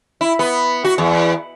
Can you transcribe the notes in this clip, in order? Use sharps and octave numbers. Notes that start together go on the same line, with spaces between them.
E4
B3
F#4
E2